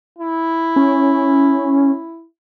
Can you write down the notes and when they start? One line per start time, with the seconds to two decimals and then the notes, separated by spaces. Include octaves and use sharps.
0.18 E4
0.76 C#4